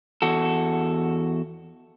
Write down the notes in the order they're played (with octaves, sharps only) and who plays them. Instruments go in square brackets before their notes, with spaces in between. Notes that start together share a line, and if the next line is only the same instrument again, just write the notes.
[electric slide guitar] E2 F#4 A4